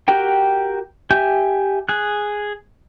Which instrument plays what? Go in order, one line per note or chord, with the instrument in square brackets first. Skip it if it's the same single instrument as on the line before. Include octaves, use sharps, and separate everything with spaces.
[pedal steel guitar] F#4 G4 A#4 G5
G4 E5 G5 G#5 G6
G#4 F#6